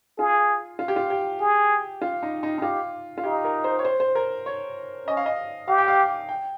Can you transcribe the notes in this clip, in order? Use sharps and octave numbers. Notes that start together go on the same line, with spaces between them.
F4 G#4
F4
G4
F4
G4
G#4
F4
D#4
D#4
D#4
F4 G4
F4
D#4 G4
A#4
C5
C#5
C5
C5
A#4
C#5
C#4 D#5
F5
D#5
G4 F5
G5
F5
G5